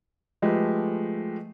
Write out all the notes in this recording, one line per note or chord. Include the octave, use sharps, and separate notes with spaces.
F3 G#3 A3 G4 B4